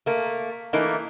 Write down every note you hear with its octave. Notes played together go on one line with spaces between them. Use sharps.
A3 A#3
E3 A3 A#3 D#4